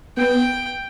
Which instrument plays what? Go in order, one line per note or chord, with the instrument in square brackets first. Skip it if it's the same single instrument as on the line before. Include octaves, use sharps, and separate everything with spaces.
[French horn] B3 [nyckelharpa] G5